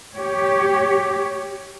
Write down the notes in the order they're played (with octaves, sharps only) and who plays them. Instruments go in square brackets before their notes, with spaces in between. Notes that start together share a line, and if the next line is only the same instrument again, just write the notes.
[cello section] G4 C#5